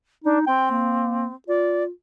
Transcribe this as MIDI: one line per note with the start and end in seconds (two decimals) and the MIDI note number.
0.24 0.39 62
0.24 0.42 63
0.47 1.33 60
0.47 0.71 79
0.71 1.27 58
1.48 1.89 65
1.48 1.84 74